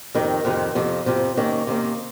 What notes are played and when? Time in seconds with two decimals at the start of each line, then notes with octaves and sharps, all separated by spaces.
0.14 F2 C3 D#3
0.45 F2 C3 D#3
0.75 F2 C3 F3
1.06 F2 C3 F3
1.37 C3 D#3 A#3 C#4
1.67 C3 D#3 A#3 C#4